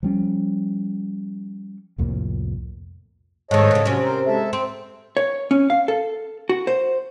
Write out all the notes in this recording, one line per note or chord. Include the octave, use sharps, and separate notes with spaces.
F3 G3 C#4
C2 F2 A2 A#3
G#2 D#3 A4 C#5 D#5
G#2 C#3
C3 F#3 C#4
A#4 C5
G#3 A4 E5
C4
C#5
C#4
F5
A4
F#4
C5